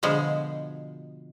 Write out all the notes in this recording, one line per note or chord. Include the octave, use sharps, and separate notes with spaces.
B2 D3 F3 G#3